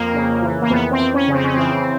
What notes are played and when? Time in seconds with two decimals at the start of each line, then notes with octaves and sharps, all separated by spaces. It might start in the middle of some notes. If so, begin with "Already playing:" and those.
Already playing: F2 A#3
0.14 C#3
0.42 E3
0.62 A#3
0.70 F2 B3
0.91 C4
0.98 F2
1.13 C#4
1.28 C#3
1.35 C4
1.44 C#4
1.54 E3 C4